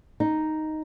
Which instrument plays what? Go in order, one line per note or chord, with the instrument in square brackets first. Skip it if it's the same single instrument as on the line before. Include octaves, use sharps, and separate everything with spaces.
[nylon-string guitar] D#4